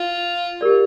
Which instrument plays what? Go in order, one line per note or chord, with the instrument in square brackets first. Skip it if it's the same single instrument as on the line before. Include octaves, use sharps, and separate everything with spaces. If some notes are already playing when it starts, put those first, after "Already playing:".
Already playing: [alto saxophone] F4
[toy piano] G4 A#4 D5